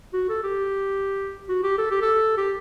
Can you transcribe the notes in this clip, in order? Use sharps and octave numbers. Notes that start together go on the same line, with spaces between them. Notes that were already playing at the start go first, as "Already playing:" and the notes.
F#4
A4
G4
F#4
G4
A4
G4
A4
G4